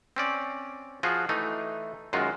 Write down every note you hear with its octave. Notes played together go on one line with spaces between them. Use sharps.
C4 C#4 D5
F3 F4 F#4 G#4
E3 A3 D#4
F#2 D#3 G#3 F4 F#4